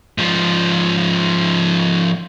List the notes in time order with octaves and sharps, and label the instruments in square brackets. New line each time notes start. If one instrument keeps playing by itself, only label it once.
[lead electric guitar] G#2 F3